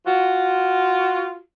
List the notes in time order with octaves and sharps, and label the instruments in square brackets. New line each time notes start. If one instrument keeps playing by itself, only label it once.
[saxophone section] F4 F#4